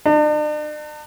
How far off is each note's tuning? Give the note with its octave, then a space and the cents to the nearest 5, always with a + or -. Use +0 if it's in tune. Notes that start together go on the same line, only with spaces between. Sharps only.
D4 +45